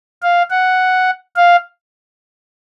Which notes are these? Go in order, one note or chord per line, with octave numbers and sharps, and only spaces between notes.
F5
F#5
F5